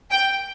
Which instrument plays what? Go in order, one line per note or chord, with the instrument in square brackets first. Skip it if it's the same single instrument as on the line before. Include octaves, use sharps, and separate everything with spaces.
[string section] G5